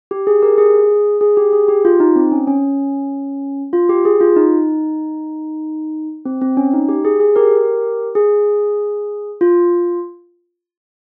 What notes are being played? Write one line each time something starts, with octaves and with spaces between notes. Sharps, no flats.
G4
G#4
G4 A#4
G#4
G#4
G4
G#4
G4
F4
D#4
C4
C#4
C#4
F4
G4
G#4
F4
D#4
C4
C4
C#4
D#4
G4
G#4
G#4
G4 A#4
G#4
F4